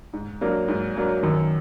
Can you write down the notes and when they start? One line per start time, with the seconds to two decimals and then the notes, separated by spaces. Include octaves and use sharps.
0.13 G#2
0.41 F#3 A#3 D4
0.68 G#2
0.97 F#3 A#3 D4
1.23 F#2 D#3